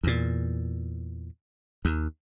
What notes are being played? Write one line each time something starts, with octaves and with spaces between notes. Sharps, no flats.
E2 A#2
D#2